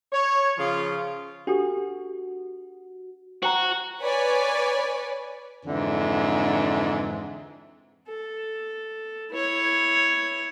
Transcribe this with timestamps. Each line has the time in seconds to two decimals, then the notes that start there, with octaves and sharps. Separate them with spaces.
0.13 C#5
0.58 C#3 F3 F4
1.47 D4 F#4 G4 A4
3.43 F#4 C5 G5 A#5
4.01 B4 C#5 D5 G#5
5.65 F2 G#2 D3 E3
8.08 A4
9.31 E4 C#5